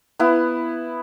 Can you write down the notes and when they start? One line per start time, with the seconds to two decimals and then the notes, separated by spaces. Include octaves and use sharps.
0.19 B3 E4